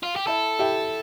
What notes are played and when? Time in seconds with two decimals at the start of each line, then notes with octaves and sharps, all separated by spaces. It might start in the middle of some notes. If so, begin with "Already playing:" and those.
0.03 F4
0.16 G4
0.27 E4 A4
0.59 E4 G4